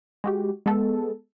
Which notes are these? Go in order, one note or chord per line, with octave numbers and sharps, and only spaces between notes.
G#3 F#4 G4
G#3 B3 A4